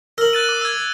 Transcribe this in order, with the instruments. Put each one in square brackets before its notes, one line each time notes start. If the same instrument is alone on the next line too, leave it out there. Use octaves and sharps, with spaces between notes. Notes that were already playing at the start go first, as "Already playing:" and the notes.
[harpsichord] A#4 [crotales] E6 F#7
[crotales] F#6 A6 D#7
D6
E6 G#6